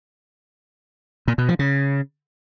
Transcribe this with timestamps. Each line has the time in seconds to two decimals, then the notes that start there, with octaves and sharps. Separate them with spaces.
1.28 A#2
1.38 B2
1.49 F3
1.59 C#3